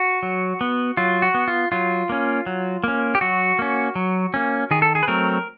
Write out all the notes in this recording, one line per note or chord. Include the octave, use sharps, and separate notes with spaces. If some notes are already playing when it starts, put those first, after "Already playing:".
Already playing: F#4
F#3
B3
F#3 F4
F#4
B3
F4
F#3 F4
A#3 C#4
F#3
A#3 C#4
G4
F#3 F#4
A#3 C#4
F#3
A#3 C#4
D#3 G#4
A4
G#4
B4
F#3 A3 C4 A#4